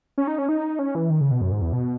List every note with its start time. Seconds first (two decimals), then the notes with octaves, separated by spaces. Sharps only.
0.18 C#4
0.27 D#4
0.38 C#4
0.49 D#4
0.79 C#4
0.95 E3
1.10 D#3
1.21 C#3
1.31 B2
1.41 F#2
1.52 G#2
1.62 E2
1.73 B2